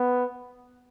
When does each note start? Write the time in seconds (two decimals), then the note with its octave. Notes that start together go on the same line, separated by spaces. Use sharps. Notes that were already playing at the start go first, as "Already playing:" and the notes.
Already playing: B3